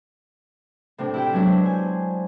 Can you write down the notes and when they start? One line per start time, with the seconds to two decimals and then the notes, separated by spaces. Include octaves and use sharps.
0.98 A2 C3 D4
1.14 E4 G4 G5
1.33 F#3 G#3 B3 D4 E4
1.63 C5 G#5